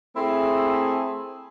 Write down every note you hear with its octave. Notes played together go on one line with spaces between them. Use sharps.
A3 C4 E4 G#4 A4